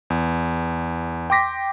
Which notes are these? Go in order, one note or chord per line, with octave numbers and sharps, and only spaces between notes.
E2
G5 C6 D6 A#6 B6